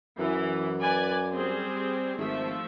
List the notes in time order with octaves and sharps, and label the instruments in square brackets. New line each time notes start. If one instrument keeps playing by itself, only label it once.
[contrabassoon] F#2 [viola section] E3
[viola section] B4 D5 G#5
G3 C4 G#4
[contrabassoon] G#1 [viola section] F3 A3 E5